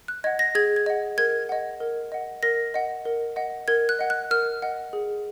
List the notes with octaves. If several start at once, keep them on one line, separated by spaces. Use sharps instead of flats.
F#6
D#5 F#5 G#6
A#6
G#4 G#6
G#6
D#5 F#5
A#4 G#6
D#5 F#5
A#4
D#5 F#5
A#4 A#6
D#5 F#5
A#4
D#5 F#5
A#4 G#6
F#6
D#5 F#5
F#6
A#4 F6
D#5 F#5
G#4